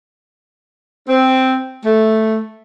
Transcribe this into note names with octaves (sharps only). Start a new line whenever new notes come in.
C4
A3